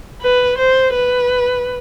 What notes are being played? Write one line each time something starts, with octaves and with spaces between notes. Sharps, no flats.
B4
C5
B4